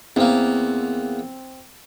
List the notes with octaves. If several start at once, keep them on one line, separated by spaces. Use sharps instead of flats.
E2 A#3 C4